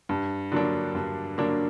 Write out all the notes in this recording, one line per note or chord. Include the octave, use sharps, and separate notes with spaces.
G2
D3 F#3 A#3 D4
G2
D3 F#3 A#3 D4